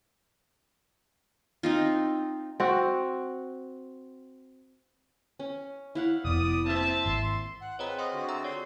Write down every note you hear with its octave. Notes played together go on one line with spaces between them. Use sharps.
C4 D#4 F4
C4 F#4
C#4
E4 F5 F#5
F1 B3 D5 D#6
A#3 C4 C5 E5 A5
G#1 C6
F#5
C4 F4 G#4 B4 C#5 D#5 A#5
C5 D#5 F#5 C6
D3 F#4
E5 A#5 E6
C#5 D5 C6